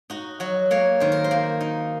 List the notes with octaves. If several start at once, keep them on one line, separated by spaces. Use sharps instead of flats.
D#4 F#4
F#3 F#4
A#3 C#5
D#3 C5
A#4
C5
A#3
D#4